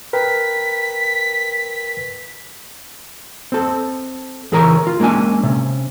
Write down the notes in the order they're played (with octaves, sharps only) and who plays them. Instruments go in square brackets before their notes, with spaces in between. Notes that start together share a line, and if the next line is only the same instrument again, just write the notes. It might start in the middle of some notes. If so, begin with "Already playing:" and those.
[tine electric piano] A#4 B4 G5 [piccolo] B6
[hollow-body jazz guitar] C4 A4
C#2 E3 G#4 A#4 C#5 A#5
F4
G#3 A#3 C#4 D4 G#5
C3 C#4